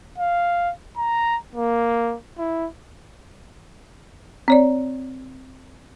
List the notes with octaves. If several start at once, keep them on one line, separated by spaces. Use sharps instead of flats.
F5
A#5
A#3
E4
C4 C#5 D5